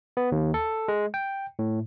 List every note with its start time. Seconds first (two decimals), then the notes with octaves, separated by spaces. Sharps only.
0.17 B3
0.32 D#2
0.54 A4
0.88 G#3
1.14 G5
1.59 A2